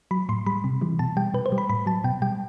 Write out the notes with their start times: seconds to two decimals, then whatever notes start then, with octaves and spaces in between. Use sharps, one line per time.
0.11 F#3 B5
0.29 A2 C6
0.46 G3 B5
0.64 C3
0.81 E3 G3
0.99 B2 A5
1.17 G3 G5
1.34 B2 B4
1.46 C5
1.52 G3
1.58 B5
1.69 A2 B5
1.86 F#3 A5
2.04 B2 G5
2.22 G3 G5